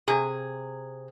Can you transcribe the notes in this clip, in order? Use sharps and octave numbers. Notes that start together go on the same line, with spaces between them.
C3 G#4